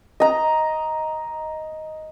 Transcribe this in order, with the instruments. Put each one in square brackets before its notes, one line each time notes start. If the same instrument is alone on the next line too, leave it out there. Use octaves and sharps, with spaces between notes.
[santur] D#5 A#5